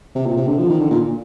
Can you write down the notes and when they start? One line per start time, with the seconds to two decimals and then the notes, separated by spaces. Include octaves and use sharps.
0.15 C3
0.26 A#2
0.37 C3
0.47 D3
0.58 F3
0.69 D#3
0.80 D3
0.91 A#2